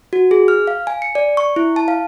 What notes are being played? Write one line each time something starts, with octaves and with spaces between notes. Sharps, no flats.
F#4
G#4
F6
F5
G#5
C#7
D5
C#6
E4
A5
F5